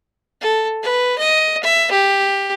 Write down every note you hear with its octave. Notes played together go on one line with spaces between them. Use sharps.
A4
B4
D#5
E5
G4